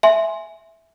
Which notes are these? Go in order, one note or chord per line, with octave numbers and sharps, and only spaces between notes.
E5 G#5 C6